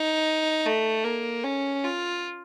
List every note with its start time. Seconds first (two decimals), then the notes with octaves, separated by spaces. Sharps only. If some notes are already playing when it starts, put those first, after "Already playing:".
Already playing: D#4
0.65 A3
1.04 A#3
1.44 C#4
1.84 F4